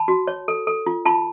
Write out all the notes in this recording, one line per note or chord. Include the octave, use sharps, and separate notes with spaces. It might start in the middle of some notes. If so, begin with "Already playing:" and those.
Already playing: A5 B5
F#4
C#5
A4
A4
F4
F4 A5 B5